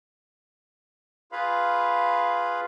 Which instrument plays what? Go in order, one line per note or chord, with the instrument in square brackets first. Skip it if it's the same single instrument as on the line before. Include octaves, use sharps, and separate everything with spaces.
[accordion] F4 G#4 B4 F5 B5